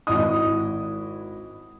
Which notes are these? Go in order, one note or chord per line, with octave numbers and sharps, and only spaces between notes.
G#1 E4 D#5 D#6